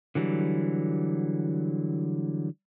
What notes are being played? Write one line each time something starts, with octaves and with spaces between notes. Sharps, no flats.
D3 E3 F#3 G3